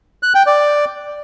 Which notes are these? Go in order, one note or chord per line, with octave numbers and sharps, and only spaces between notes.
F#6
G5
D5